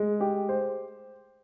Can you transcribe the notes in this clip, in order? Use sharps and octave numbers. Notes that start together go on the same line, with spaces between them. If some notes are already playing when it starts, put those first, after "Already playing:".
Already playing: G#3
G4
C5